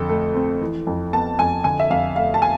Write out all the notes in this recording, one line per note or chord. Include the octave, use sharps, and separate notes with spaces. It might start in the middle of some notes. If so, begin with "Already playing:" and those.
Already playing: F2 D3 A4
A3
C4
E3
F2
B3 A5
F2 G#5
D3 G#5
E5
F2 F5
A3 F5
A5
G#5